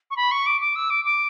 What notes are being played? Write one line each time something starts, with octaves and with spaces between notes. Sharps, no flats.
C#6
B5
C#6
D6
D6
E6
D6
D6